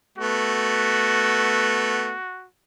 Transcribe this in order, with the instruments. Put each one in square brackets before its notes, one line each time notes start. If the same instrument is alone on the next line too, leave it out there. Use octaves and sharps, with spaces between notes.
[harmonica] A3 B3 [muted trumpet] F#4